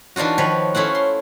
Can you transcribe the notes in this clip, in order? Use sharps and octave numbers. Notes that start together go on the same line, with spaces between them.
E3 D4 D#4 F4 F#4
D#3 F3 B4 C#5
A3 C#4 E4 F4 F#5
C6